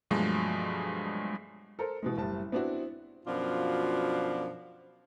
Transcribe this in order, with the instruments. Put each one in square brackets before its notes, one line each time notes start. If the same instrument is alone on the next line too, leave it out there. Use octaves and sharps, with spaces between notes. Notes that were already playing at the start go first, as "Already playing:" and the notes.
[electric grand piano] G2 B2 F3 F#3 G#3 A3
[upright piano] A4 A#4 C5
B2 E3 G#3
F#1 A2 G3 A5
B3 C4 D4 E4 F#4
[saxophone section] F#2 B2 F3 D4 F4